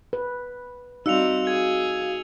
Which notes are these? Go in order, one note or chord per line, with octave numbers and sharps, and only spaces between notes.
B4
G3 C4 D#4 F#4 F5 E6 C#7 F7
G#4 G#6